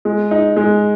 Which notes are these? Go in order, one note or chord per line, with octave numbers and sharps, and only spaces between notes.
G#3
D#4
G#3